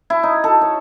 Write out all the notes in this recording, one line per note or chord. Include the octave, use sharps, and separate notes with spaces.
E4
D#4
A4
C#5